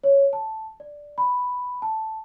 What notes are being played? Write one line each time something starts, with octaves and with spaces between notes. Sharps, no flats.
C#5
A5
D5
B5
A5